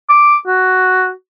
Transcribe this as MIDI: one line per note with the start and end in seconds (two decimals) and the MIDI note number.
0.09 0.37 86
0.47 1.11 66